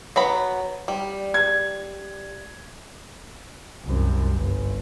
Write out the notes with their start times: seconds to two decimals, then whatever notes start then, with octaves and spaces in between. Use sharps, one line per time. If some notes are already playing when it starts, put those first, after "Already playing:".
0.16 F#3 B3 B5
0.88 G3
1.34 G#6
3.85 C2 F#2
4.35 G1